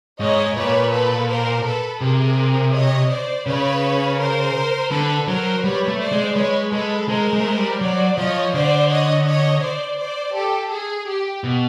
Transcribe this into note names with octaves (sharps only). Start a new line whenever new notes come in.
G#2 C#5 D#5
A#2 B4 C#5
A4 B4
A#4 C5
A4 B4
C3 G#4 A#4
C#5 D#5
C5 D5
C#3 B4 C#5
A#4 C5
D3 A4 B4
F#3 A#4 C5
G3 B4 C#5
A3
C5 D5
G#3
G#3 B4 C#5
G#3 A4 B4
G#3 A#4 C5
G#3
A3
G#3
G3
F#3 C5 D5
F3 C#5 D#5
D3 C5 D5
C#5 D#5
C#5 D#5
C5 D5
C5 D5
G4 A4
G#4
G4
B2